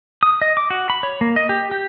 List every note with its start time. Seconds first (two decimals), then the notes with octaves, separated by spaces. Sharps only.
0.23 D#6
0.42 D#5
0.57 D6
0.70 F#4
0.90 B5
1.03 C#5
1.21 A#3
1.36 D#5
1.49 G4
1.71 G4